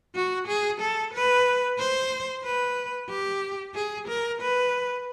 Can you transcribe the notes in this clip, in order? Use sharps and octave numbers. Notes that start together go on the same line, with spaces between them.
F#4
G#4
A4
B4
C5
B4
G4
G#4
A#4
B4